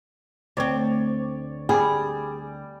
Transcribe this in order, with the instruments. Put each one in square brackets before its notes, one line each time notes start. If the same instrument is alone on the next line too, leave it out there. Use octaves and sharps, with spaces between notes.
[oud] D2 C4 [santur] C#5 D5
[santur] G3 D5 [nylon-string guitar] G#4